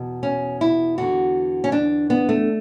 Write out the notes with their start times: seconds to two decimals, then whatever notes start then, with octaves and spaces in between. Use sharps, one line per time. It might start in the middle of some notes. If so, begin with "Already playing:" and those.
Already playing: E2 B2
0.23 C#4
0.61 E4
0.98 E2 D3 F#4
1.64 C#4
1.72 D4
2.10 B3
2.29 A3